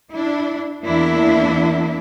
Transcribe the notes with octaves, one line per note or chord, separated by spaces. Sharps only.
D4 E4
E2 A#3 D4 E4 E5